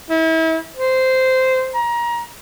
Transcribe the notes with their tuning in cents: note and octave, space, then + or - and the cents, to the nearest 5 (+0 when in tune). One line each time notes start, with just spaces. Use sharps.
E4 -35
C5 -10
A#5 +25